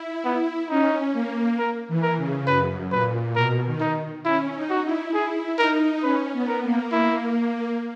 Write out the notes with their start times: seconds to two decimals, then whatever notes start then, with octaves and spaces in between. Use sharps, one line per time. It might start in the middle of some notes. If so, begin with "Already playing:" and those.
Already playing: E4
0.25 B3
0.70 C#4 D#4
1.13 A#3
1.58 A#4
1.88 E3
2.02 A#4
2.17 C#3
2.47 F#2 B4
2.91 A#2 B4
3.35 B2 A#4
3.66 D#3
3.81 D#4
4.25 C#4 E4
4.55 D#4
4.70 F#4
4.84 E4
5.13 E4 G#4
5.58 D#4 A#4
6.02 C#4 B4
6.33 B3
6.48 A#4
6.63 A#3
6.92 E4